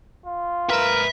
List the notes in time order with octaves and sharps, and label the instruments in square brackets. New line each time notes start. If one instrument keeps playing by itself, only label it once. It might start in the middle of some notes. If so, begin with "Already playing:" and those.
[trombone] F4
[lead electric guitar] G#2 B4 [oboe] A#4 [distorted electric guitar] E5